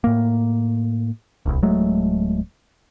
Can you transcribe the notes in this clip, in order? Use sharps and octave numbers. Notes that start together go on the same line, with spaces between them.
A2 A#3
D1 C2
D1 F#3 G#3 A3